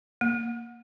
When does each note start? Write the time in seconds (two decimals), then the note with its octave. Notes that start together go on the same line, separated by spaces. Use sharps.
0.21 A#3